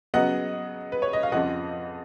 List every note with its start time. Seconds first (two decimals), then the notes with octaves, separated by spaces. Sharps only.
0.14 C#3 F#3 B3 D#5 F#5
0.92 B4
1.02 C#5
1.13 D#5
1.23 F5
1.32 F2 C#3 F3 D#5 F#5